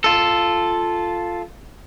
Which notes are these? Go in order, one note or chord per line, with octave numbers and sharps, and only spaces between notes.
F4 A4